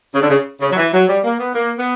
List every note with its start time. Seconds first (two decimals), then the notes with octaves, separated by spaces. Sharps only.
0.13 C#3
0.21 D3
0.28 C#3
0.60 C#3
0.71 F#3
0.77 E3
0.92 F#3
1.07 G3
1.23 A#3
1.38 B3
1.54 A#3
1.78 B3